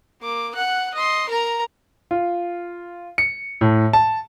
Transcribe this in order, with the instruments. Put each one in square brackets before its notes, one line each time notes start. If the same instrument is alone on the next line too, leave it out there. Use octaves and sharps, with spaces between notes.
[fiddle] A#3 D6
F#5 F#6
D#5 C6
A#4 A#5
[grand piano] F4
C#7
A2
A5